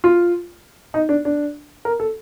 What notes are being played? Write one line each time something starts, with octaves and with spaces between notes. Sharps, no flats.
F4
D#4
D4
D4
A#4
A4